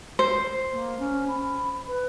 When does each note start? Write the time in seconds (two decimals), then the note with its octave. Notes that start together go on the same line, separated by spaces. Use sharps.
0.19 C5
0.72 A#3
0.99 C#4
1.28 B5
1.86 B4